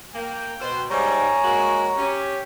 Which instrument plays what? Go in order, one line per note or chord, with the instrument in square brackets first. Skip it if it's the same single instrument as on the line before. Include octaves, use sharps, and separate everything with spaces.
[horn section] A#3 [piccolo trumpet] G5
[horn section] B2 C5
[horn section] G#2 G3 [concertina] C#5 A#5 [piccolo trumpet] G#5
[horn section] G#3 A#3 F#4
[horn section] C#4 [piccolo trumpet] G4